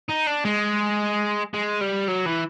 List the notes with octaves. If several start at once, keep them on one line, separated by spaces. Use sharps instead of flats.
D#4
D4
G#3
G#3
G3
F#3
E3